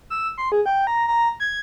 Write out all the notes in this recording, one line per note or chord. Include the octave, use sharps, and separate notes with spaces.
E6
C6
G#4
G5
A#5
A#5
G#6